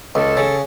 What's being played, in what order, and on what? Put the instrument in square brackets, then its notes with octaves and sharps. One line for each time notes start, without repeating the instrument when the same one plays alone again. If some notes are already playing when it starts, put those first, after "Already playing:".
[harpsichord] C#2 [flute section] A4
[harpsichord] C#3